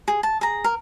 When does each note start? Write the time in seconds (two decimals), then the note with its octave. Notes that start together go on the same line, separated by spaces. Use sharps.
0.08 G#4
0.23 A5
0.41 G#4 A#5
0.64 A#4